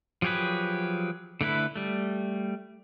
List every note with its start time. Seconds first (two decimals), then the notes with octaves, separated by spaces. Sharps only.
0.22 F3 F#3 G4 G#4 B4
1.41 D3 A3 E4 B4
1.76 G3 A3